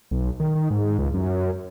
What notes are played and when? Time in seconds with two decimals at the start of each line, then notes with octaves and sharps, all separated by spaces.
0.11 B1
0.40 D#3
0.55 D#3
0.71 G#2
0.99 C#2
1.14 F#2